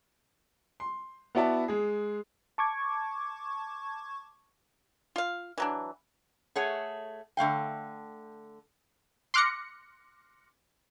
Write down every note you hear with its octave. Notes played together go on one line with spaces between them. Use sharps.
C6
B3 E4 F#4 D5 E5 A5
G#3 G#4
A5 C#6 D6 G#6
F4 F5
E3 F#3 D4
A3 G#4 C#5 F#5
D3 A3 F5 G5
C6 D6 F6 F#6 A#6 C#7